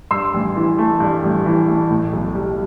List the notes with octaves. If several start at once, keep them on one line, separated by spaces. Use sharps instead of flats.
G2 C6 E6
A1
E3
A3
G2
A1
E3
A3
A2
B1
G3